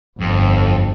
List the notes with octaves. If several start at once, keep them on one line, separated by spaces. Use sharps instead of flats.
G1 F2